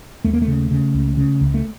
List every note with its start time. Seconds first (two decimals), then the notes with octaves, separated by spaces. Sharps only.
0.25 D#2 A3
0.33 A#3
0.42 A3
0.48 C#3
0.71 C#3
0.94 C#2
1.17 C#3
1.41 C#2
1.54 A3